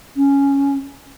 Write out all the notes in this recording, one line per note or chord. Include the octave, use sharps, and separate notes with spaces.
C#4